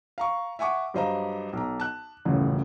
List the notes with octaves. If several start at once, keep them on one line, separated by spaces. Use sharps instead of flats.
F5 A#5 C#6
E5 F#5 G#5 C#6 D6
G2 F#3 C5 D#5 F5 A#5
B1 A#5
A5 F#6
D#1 A1 F#2 A2 C#3